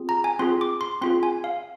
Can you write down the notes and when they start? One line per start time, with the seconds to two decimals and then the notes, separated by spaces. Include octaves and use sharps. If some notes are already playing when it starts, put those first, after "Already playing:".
Already playing: C4 F4 G#4
0.09 A#5
0.24 G#5
0.39 C4 F4 G#4 C6
0.61 D6
0.81 C6
1.01 C4 F4 G#4 C6
1.23 G#5
1.44 F5